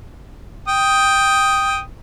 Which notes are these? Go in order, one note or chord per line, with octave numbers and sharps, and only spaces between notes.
G5 D#6